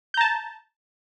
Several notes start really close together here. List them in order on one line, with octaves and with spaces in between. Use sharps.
G6 A#5 A5